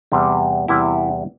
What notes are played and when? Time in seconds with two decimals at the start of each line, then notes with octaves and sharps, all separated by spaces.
0.12 E2 C3 G3
0.68 E2 C3 G3 E4